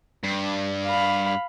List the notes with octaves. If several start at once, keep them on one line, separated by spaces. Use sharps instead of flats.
G2
F5 B5